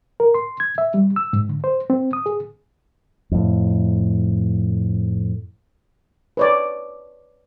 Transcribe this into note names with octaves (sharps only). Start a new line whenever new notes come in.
A#4
C6
G#6
E5
G3
E6
G#2
D3
C5
C4
D#6
G#4
F2 A2
B4 C#5 D5